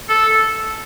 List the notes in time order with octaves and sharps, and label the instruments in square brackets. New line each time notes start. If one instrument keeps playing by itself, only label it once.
[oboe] A4